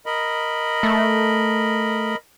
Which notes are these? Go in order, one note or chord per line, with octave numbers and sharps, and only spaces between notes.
A#4 D#5 B5
A3